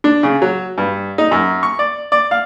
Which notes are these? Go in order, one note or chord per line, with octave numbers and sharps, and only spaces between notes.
D4
C#3
F#3
G2
D#4
F#2
C#6
D5
D5
F5